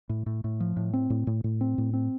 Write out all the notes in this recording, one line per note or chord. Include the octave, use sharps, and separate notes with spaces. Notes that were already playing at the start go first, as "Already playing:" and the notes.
A2
A2
A2
F3
A2
C4
A2
A2
A2
C4
A2
C4